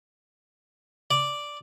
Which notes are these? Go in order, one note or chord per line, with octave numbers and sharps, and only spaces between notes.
D5